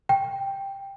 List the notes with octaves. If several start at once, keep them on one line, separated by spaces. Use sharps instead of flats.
G5